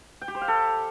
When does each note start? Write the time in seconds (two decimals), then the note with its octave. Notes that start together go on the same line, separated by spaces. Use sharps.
0.21 G5
0.28 G4
0.35 C5
0.41 F5
0.48 A4